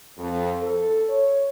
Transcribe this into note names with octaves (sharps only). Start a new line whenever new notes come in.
F2
A4
C#5